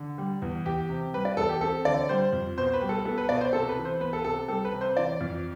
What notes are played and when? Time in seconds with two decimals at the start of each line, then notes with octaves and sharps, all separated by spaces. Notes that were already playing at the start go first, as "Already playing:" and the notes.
Already playing: D3
0.18 G3
0.42 E2
0.66 E2 G4
0.89 C3
1.13 G3 B4
1.25 D5
1.37 E2 A4
1.49 G4
1.61 C4 A4
1.85 D3 D5
2.09 G3 C5
2.33 F2
2.57 B2 C5
2.73 B4
2.81 G3
2.89 A4
3.05 B3 A4
3.18 B4
3.29 B2 D5
3.41 C5
3.53 C3 A4
3.69 B4
3.77 E3
3.85 C5
4.00 B3 B4
4.13 A4
4.25 C3 A4
4.48 G3 A4
4.65 B4
4.72 C3
4.81 C5
4.96 E3 D5
5.21 F2